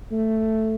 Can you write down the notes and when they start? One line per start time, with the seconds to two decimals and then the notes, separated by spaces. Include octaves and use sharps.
0.12 A3